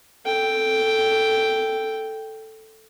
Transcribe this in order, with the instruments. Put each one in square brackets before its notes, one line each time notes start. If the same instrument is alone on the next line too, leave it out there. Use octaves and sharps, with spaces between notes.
[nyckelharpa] A4 G5